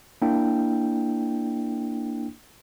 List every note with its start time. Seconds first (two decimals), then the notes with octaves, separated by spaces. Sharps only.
0.22 A#3 D4 E4 G5